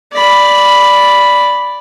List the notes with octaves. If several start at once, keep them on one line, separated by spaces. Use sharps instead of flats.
D5 B5